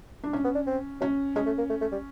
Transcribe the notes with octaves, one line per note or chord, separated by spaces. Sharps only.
D4
C#4
B3
D4
C4
F#3 C#4
G#3 C#4
A3
A#3
A3
A3
G3